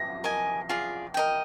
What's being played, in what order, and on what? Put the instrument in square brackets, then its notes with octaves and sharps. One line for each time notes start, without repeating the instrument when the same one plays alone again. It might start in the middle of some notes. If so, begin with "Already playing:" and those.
Already playing: [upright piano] A#6
[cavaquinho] A#4 D#5 G#5
F4 G#4 D5
A#4 D#5 G5